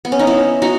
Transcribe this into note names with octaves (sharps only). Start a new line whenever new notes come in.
B3
C#4
D#4
C#4 E4
D#4 F#4